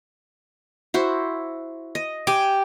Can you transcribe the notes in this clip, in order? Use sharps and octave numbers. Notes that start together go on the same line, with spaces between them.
E4 F#4 C5
D#5
G4 G#5